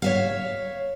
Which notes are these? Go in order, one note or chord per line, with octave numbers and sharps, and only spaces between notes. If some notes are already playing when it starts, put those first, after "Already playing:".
C#5 E5 F5